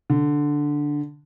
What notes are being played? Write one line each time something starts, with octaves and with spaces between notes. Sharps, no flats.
D3